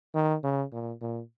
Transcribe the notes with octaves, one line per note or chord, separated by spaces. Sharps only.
D#3
C#3
A#2
A#2